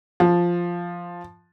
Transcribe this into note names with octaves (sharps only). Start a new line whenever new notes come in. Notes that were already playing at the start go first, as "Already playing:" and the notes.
F3